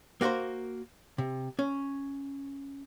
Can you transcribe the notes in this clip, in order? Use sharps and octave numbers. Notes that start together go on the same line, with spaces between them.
A#3 F#4 G4 A#4 C5
C3
C#4